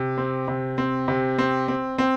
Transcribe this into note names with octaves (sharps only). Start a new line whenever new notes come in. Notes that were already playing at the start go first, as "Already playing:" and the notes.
Already playing: C3
C4
C3
C4
C3
C4
C4
C4